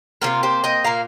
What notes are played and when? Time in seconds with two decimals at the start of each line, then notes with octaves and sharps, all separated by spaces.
0.22 C3 F3 A#3 F4 A#4
0.43 G4 C5
0.64 D#5 G5
0.84 A#2 A#3 F5 A#5